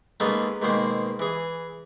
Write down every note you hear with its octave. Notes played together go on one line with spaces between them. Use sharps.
G#3 A#3 B3 C#4 D#4 A4
G#2 B2 D#3 G#3 A#3 C5
E3 G#4